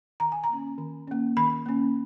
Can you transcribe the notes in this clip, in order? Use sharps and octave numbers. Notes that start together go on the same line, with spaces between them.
D#3 A#5
G#5
A#5
A#3 C#4
D#3
A#3 C#4
D#3 B5
A#3 C#4